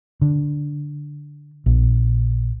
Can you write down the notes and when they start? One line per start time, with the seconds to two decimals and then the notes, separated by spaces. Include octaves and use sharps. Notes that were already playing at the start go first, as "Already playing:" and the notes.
0.21 D3
1.66 A#1